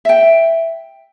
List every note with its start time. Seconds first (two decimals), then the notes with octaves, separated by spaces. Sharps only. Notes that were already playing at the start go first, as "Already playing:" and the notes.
0.05 E5 G5